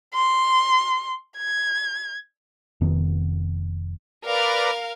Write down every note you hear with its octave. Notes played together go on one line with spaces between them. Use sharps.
C6
G#6
F1 F2 D#3 B3
A#4 B4 D5 F5 A#5